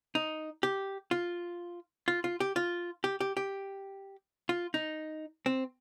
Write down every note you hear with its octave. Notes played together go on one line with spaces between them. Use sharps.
D#4
G4
F4
F4
F4
G4
F4
G4
G4
G4
F4
D#4
C4